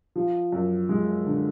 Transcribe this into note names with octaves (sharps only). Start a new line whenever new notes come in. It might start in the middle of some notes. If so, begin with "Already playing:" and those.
F3
F#2
G#3
D3